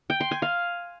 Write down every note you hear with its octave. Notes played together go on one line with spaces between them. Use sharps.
G5
C6
G#5
F5